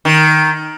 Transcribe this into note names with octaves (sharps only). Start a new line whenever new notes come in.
D#3